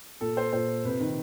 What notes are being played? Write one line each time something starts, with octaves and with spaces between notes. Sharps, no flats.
A#2 A4
C5
A#2 C5
C3 B4
D#3